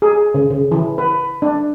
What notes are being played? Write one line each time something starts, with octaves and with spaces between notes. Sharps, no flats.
G#4
C#3
C#3
E3
B4
D4